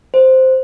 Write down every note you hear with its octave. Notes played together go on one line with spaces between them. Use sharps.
C5